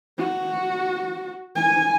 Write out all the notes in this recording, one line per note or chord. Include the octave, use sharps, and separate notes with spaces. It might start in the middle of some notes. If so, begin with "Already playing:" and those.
F#4
G#5